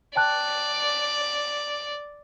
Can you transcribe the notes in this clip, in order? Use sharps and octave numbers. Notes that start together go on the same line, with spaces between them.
D5 G5 A5 F#6